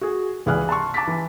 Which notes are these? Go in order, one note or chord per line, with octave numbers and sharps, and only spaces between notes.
F#4 G#4
C#2 E3 G#4 D5 F6 F#6
A5 C6 C#6
A5 D6 A6 B6
E3